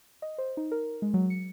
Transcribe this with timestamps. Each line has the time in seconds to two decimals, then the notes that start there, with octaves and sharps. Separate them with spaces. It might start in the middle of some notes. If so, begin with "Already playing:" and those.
0.22 D#5
0.38 C5
0.57 D#4
0.72 A#4
1.02 G#3
1.14 F#3
1.30 C#7